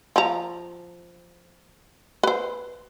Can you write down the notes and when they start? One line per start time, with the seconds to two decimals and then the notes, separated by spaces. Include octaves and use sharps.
0.16 F3 A#5
2.23 B4 C5